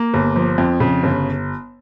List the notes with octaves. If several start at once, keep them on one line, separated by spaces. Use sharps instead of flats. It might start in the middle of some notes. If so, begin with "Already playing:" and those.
Already playing: A#3
G1
F3
F2
C#3
G1